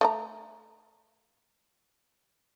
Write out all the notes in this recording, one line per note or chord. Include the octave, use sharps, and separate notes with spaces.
A3 D#5 A#5